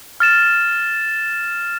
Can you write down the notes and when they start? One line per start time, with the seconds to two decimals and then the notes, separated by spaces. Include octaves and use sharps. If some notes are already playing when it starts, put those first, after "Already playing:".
0.20 F6 A6 E7